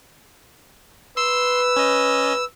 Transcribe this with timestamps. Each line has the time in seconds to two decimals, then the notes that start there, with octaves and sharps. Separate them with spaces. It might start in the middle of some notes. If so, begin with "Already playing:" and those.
1.17 B4 C6 E6
1.76 C#4 D#5